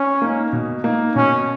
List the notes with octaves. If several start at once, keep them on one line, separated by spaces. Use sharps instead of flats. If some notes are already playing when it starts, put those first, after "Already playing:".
Already playing: C#4
A#3 D#4
B2
A#3 D#4
B2 C#4